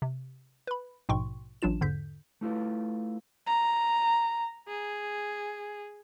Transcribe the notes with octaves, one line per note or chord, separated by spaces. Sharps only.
C3
B4 B5
A#1 G#2 B2 G5 C6 C#6
A1 F#3 D4 F4 E7
E2 G#2 D3 G6 B6
A3 E4 F4 B4
A#5
G#4